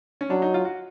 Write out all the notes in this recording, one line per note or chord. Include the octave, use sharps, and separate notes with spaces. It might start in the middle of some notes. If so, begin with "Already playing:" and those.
C#4
F#3 D4
D#4
F4
F#4